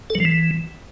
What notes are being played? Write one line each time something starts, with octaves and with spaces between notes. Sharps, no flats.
A4
F#3
F3
E3